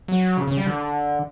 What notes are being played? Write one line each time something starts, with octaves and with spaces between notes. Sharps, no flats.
F#3
C#3
C#3
G3
D3